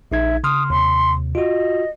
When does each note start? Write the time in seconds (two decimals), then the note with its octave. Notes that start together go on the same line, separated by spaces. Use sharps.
0.12 A#1 D#4 E5 G#6
0.44 C#3 C6 D#6 F6
0.70 D#2 C3 C6
1.35 F4 F#4 D#5